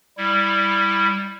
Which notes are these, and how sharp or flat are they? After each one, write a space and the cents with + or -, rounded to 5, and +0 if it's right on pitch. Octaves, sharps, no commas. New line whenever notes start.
G3 +0 E4 +0